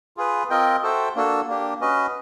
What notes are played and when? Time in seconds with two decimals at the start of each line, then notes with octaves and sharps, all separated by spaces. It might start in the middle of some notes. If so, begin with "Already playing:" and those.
0.17 F4 G#4 B4
0.50 C4 F4 A#4 D#5 G5
0.82 F#4 A4 C5 E5 G5
1.16 A#3 D4 F#4 A4
1.48 A#3 D4 G4
1.81 C#4 F#4 B4 D#5